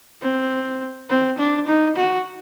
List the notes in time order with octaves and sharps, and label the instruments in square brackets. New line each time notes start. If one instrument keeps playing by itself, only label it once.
[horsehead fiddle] C4
C4
D4
D#4
F#4